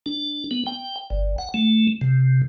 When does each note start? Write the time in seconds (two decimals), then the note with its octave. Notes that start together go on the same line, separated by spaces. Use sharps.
0.06 D4
0.51 B3
0.66 G5
1.10 G1
1.38 F#5
1.54 A3
2.01 C3